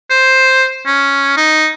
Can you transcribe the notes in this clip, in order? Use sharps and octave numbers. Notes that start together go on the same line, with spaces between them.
C5
C#4
D#4